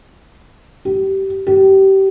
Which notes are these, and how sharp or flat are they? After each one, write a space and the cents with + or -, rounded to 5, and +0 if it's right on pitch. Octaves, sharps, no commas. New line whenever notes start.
G4 -20
G4 -25